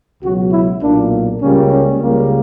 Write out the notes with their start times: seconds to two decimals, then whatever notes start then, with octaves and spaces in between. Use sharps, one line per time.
0.22 C#2 B2 F#3 F#4
0.52 E4
0.82 B1 A#2 A#3 D4
1.41 C#2 C#3 G3 A#3 C#4
1.71 C#4
2.01 C#2 C#3 G3 A#3